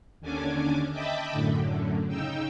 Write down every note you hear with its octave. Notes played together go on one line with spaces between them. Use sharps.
D#2 D3 C#4 D4 G#5 D6
D#5 E5 G5 A5 B5 D6
F#2 A2 D3
C#3 D#4 G5 E6